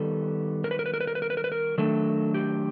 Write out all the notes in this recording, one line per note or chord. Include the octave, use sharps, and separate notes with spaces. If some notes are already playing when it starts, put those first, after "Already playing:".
Already playing: D#3 G3 B3 D#4 A4
A#4
B4
A#4
B4
A#4
B4
A#4
B4
A#4
B4
A#4
B4
A#4
D#3 F#3 A3 D4 A4
G4